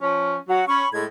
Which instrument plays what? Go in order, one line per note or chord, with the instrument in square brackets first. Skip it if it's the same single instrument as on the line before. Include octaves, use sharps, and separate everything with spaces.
[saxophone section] F3 C#4
[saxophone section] F#3 [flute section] F#4 F#5
[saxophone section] C#4 [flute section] B5 C#6
[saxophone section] A2 G#3 [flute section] G#6